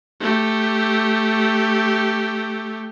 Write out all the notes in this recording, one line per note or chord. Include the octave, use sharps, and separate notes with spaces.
A3 G4